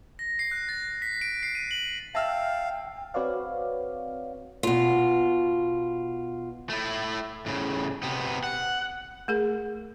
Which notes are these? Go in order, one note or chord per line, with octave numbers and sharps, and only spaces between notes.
A#6
C7
F#6
A6
B6
D7
C7
D#7
F#7
E5 F5 G5 A5 E6 F6
C4 F#4 B4 C#5 D5 F5
B2 F4
A3 E4
A2 C#3
C3 B3
F#5
A3 G#4 A#4